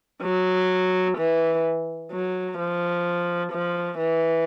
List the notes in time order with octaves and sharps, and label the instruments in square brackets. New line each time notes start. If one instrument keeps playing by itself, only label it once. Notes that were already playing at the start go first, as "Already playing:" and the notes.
[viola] F#3
E3
F#3
F3
F3
E3